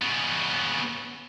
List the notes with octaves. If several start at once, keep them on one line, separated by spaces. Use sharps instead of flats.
C#3 B3